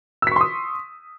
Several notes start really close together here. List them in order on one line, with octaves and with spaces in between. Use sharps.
E6 B6 C#6 C6 D#6